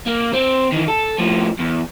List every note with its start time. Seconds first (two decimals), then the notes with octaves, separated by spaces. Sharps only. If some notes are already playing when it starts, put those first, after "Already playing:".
0.06 A#3
0.33 C4
0.72 D#3 E3
0.88 A4
1.18 A2 F3
1.59 E2